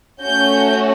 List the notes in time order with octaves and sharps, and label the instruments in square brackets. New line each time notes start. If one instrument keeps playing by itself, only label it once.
[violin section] A3 C#4 F#4 G6